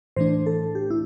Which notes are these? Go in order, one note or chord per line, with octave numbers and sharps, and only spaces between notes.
A2 E3 A3 D4 C5
A4
G4
E4